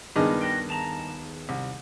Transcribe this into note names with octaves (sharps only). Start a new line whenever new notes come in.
C#2 G2 D#3 B3 G#4 D#5
F#4 G5
D#2 A5 A#5
C2